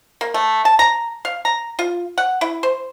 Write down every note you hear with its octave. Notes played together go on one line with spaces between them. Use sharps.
A#3
A3
A5
A#5
F5
A#5
F4
F#5
E4
C5